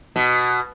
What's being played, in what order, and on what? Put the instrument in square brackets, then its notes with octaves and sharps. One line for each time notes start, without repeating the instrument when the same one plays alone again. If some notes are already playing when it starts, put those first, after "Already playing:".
[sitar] B2